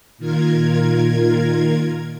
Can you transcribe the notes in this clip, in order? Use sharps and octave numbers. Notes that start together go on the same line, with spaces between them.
A#2 D#3 F4 A#4 G#6